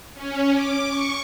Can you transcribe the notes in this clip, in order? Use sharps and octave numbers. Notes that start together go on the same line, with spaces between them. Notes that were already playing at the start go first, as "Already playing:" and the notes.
C#4
D6
C#6